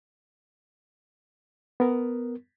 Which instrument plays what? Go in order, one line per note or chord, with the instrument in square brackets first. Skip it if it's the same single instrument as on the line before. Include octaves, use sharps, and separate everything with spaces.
[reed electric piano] B3 A#4